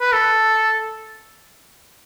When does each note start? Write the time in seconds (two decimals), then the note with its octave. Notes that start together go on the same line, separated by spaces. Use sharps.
0.01 B4
0.13 A4